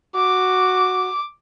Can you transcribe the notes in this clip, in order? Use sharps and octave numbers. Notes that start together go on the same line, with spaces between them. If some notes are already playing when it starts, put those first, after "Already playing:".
F#4 D6